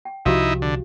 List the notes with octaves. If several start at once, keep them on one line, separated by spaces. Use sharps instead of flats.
G5
C2 F3 D#4 E4 F#4 G4 F5
D3